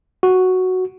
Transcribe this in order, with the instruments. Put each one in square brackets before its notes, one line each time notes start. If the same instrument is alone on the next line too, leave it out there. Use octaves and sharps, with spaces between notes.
[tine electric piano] F#4